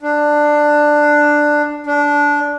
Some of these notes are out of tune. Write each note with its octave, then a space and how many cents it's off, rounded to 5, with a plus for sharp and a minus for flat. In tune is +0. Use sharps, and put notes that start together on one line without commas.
D4 +10
D4 -15